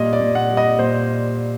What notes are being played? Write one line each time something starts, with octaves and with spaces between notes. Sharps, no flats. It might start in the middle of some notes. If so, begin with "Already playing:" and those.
Already playing: A#2 G3 D#5
D5
A#2
F#5
G3
D#5
A#2 C5